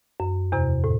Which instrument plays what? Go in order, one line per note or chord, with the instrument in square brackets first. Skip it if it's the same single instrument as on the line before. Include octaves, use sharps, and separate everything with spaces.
[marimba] F#2
E2 C3 A#5
A2